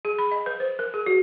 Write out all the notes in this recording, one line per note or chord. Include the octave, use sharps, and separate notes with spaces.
G#4
B5
D#5
B4
C5
A#4
G#4
F#4